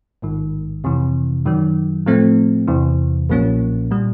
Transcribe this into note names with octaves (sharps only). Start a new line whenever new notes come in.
A1 G#2 D#3
F2 C3 E3
F#2 D#3 F#3
A2 F3 A3 C4
E2 C3 E3
B1 A#2 F3 A#3 C#4
A#2 G3